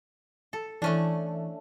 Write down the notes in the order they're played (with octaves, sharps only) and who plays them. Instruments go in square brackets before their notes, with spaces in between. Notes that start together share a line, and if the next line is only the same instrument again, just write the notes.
[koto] A4
[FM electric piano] E3 [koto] A3 C#4 D4